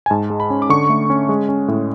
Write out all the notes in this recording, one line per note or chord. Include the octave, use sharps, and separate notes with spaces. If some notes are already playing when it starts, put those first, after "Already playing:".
G#5
G#2 A5
G#3
B5
C#4
D6
D3 C#6
A3
C#4
G#3
C#4
A2